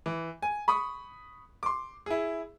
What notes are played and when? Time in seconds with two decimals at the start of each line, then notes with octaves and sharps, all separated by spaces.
0.06 E3
0.42 G#5
0.68 B5 C#6 D#6
1.63 C6 D6
2.06 E4 G#4